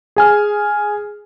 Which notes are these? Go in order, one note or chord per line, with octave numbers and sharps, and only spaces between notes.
G#4 G#5 F6